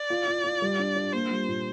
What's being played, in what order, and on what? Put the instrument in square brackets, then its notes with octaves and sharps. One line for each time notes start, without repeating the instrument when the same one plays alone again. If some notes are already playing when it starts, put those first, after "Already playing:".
Already playing: [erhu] D5
[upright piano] F4
F4
F4
G3
D4
D4
[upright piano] A#3 [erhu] C5
[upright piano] G3
A#2